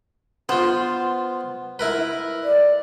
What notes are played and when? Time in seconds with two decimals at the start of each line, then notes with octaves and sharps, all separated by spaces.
0.49 B3 F4 C5
1.79 E4 A#4 B4
2.44 D5